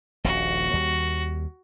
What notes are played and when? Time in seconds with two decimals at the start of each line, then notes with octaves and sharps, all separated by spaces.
0.24 D#1 A#1 F#4
0.73 D#2 G3